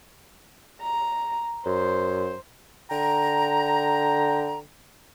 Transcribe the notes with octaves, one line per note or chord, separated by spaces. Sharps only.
A#5
F#2 C5
D3 G5 A#5